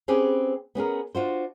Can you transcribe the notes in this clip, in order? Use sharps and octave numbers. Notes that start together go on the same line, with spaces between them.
C4 C#4 G4 G#4 B4
B3 C#4 G#4 A#4
D4 F4 F#4 C5